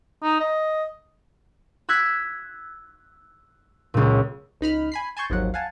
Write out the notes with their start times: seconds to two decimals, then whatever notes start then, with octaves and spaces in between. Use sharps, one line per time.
0.23 D#4
0.40 D#5
1.89 E6 F#6 G#6 B6
3.94 C#2 A#2
4.61 C#2 D#4 B5 F6
4.92 G#5 B5 C7
5.17 G#5 A5 C6 C#6 G6
5.30 G#1 D#2 F3 F#3 F#5
5.54 F5 F#5 G#5 A5